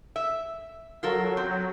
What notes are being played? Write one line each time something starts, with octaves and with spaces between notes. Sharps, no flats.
E5
F#3 F4 A4 A#4
C4